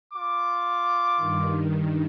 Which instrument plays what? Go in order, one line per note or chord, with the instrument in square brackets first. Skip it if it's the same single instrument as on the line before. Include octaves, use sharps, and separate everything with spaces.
[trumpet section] F4 D6
[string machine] G2 D#3